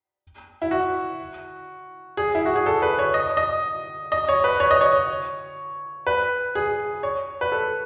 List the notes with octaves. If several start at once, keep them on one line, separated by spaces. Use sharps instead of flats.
E4
F#4
G#4
E4
F#4
G#4
A4
B4
C#5
D#5
D#5
D#5
C#5
B4
C#5
D#5
C#5
B4
G#4
C#5
B4
A4